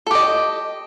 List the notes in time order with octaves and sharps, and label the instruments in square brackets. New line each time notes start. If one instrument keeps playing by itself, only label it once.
[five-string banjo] A4
G4
D#5